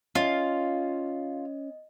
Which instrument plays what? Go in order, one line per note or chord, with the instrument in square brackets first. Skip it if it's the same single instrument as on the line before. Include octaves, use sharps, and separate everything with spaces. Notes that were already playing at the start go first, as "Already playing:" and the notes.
[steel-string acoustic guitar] C#4 [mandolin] F4 [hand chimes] D#5